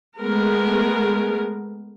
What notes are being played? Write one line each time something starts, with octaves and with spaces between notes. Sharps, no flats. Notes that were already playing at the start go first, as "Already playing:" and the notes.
G#3 A3 B3 A#4